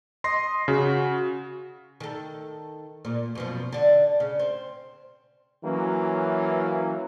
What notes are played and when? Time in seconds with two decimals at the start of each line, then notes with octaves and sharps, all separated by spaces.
0.24 D#5 C6 A#6 C7
0.68 C#3 F#4
2.00 D#3 A4
3.05 A#2
3.35 F#2 B2 F3
3.72 D3 D4
4.20 C#3
4.40 C4
5.64 E3 F#3 A#3 C#4